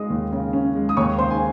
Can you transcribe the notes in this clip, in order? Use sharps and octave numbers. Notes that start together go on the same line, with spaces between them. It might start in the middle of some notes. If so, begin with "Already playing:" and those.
Already playing: C#3 G#3 D#5 D#6
D#2
C#3
C#4
G#3
D#6
D#2 C#5 C#6
C#3 C5 C6
G#5